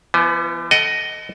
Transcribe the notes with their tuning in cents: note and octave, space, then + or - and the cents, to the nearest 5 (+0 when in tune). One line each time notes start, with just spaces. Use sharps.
E3 +45 B3 -5 D#5 +35
A4 -5 D#5 +0 F#5 +40